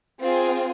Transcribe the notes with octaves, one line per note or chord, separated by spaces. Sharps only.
C4 F4 G#4